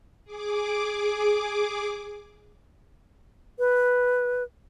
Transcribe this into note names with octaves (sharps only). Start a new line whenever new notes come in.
G#4 D6
B4